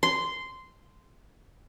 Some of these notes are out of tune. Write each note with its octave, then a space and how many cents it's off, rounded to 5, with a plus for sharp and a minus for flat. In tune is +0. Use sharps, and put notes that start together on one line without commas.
C6 -10